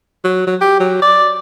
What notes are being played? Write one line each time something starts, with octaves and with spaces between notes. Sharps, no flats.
F#3
F#3
G4
F#3
D5